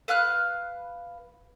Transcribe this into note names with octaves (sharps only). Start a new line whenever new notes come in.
B4 F5 F6 F#6